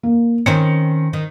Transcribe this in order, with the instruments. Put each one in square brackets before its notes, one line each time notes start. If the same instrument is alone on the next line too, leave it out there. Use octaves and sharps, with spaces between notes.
[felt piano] A#3
[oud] D#3 C4 C#4 [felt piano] C#7
[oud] D#3